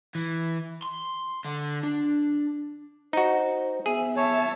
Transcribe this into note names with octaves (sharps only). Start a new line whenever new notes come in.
E3
C6
D3
D4
D#4 F#4 C5
B3 G#4 E5
C#5 E5 A5